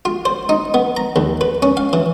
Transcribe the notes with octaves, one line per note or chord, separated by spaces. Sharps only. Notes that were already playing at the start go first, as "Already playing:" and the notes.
F4
C5
D#4
B3
A#5
D#2
B4
C#4
F5
E3